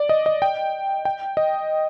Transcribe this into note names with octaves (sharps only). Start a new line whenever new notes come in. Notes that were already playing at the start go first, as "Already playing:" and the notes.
Already playing: D5
D#5
D#5
G5
G5
D#5